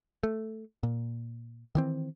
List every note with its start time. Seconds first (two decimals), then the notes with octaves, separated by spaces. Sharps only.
0.23 A3
0.83 A#2
1.75 D#3 E3 C4